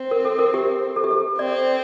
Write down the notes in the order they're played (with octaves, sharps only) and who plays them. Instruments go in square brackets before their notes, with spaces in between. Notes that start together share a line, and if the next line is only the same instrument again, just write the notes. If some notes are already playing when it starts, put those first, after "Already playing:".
Already playing: [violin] C4
[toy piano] A#4
A4
A#4
G4
A4
G4
A4
[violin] C4 [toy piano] D5